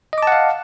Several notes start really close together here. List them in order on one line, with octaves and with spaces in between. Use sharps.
D#5 D6 A5 F#5 F5